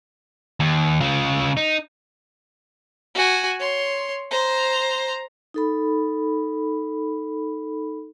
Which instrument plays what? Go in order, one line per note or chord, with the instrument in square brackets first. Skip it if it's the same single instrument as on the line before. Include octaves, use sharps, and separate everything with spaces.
[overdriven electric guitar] D#2
C#3 F4
D#4
[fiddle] F#4 G#5
C#5 C6
C5 A#5
[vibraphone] D#4 A4 B5